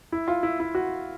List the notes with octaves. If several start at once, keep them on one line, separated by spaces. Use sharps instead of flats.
E4
F4
E4
E4
F#4